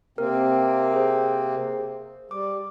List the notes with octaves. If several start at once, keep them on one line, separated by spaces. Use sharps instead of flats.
C3 A#3 C4 A#4
G#4 C5
G3 D6